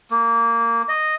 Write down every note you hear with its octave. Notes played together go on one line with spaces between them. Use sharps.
A#3
D#5